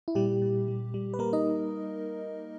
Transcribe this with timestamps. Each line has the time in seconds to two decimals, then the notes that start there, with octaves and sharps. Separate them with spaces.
0.08 E4
0.15 A#2 G3 G4
0.42 A#2
0.68 G3
0.94 G3
1.14 B4
1.19 G3 A#3 A#4
1.33 D#4 D#5